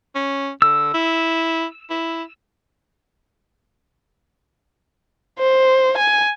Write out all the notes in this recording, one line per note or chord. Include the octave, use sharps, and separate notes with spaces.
C#4
D3 E6
E4
E4
C5
G#5